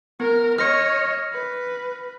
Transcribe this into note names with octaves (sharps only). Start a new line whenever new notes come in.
B3 A#4
C#5 D#5 F6 A#6 C#7
B4